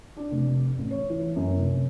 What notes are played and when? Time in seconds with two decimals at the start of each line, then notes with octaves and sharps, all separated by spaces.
0.17 D4
0.32 F1
0.78 A1
0.91 C#5
1.10 E3
1.36 F#2
1.57 F1